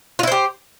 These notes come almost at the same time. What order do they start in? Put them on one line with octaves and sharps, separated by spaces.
F4 E4 C5 G4